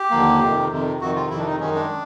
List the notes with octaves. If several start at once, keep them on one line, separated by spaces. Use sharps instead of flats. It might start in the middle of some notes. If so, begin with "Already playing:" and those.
Already playing: G4
D#2 D3 F3 A#3
F2 C3 D#3
F2 C3 D#3
F2 C3 D#3 F#4
F4
F2 C3 D#3 E4
D4
D#4
F#2 D#3 G#3 C#4
D4